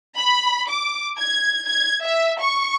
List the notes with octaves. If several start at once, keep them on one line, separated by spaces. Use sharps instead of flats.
B5
D6
G#6
G#6
E5
C#6